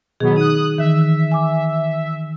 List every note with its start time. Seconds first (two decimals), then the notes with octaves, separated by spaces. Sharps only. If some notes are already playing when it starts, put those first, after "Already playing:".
0.20 B2 D#3 F#3 B3 G#4
0.36 D#4 D#6 F#6
0.78 D#3 E3 E5
1.32 G#5 D6